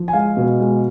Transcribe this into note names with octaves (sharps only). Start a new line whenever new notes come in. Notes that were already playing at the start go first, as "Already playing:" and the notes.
Already playing: F3
G#5
G#3 F5
B2
G#3